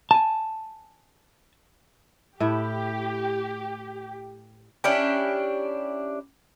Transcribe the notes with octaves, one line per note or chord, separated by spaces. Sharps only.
G#5 A5
A2 E4 G4
C#4 D4 E4 G4